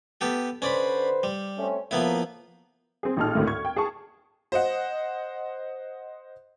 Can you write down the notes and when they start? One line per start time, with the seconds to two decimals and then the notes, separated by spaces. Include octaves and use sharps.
0.21 B3 G4 A4
0.62 D3 C#4 B4 C5 D5 B5
1.23 G3
1.58 A3 C4 C#4
1.91 A2 F3 A#3 B3 E4
3.03 C4 G#4
3.17 A1 A#2 D#4 A4 F6
3.35 G#1 D2 A2
3.47 C#6 G#6
3.65 G5
3.76 G#4 A5 C#6
4.52 C5 D#5 F#5